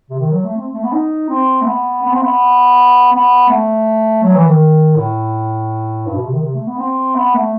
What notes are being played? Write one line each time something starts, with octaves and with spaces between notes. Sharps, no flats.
C3
D#3
F#3
A3
C4
A3
B3
D#4
C4
A3
B3
B3
C4
B3
B3
A3
F#3
E3
D#3
A2
G2
B2
C3
D#3
C3
A3
B3
C4
B3
A3